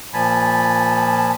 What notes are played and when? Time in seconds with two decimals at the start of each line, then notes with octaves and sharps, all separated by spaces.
0.14 A#2 F3 G#5 A5 B5